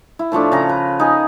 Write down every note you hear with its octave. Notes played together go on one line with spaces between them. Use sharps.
E4
A2 F3 A3 D4
C#3 A#5
B4
D#4 G#4